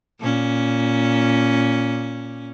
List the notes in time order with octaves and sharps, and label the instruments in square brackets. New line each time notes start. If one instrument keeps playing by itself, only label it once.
[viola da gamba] A#2 C#4